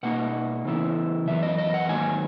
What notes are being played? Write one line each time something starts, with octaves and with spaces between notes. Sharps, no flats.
B2 A#3 D#4 F#5
C#3 E3 B3 E4
F#2 E3 B3 E5
D#5
D#5
F#5
G#2 D#3 F#3 A#3 G#5